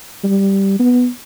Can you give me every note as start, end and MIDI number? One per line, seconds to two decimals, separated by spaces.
0.24 0.75 55
0.79 1.07 59